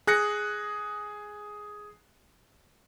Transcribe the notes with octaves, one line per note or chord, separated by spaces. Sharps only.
G#4 F#6 A#6 C#7